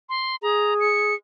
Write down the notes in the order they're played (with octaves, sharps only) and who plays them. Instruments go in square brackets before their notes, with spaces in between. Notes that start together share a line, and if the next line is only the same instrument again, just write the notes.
[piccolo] C6
[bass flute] G#4 [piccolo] A#5
[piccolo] C#7